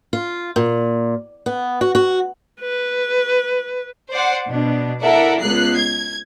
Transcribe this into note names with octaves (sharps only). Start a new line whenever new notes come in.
F4
A#2
B3
F#4
F#4
B4
C5 D5 F#5
B2 D4
E4 A4 A#4 D5 E5 F#5
C#2 B3 F#6 C7
G#6